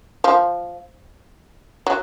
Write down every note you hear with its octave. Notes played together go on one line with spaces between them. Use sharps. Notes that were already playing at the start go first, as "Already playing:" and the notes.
F3
F#3